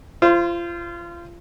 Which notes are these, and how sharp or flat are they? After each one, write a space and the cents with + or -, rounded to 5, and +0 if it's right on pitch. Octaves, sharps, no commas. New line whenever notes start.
F4 -30 C5 +0